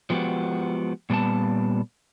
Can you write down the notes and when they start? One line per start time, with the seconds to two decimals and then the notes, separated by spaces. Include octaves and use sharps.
0.10 F3 G#3 B3 F#4 G4
1.10 A#2 G3 B3 A5